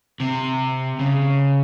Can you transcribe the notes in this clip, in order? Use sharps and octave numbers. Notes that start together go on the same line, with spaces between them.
C3
C#3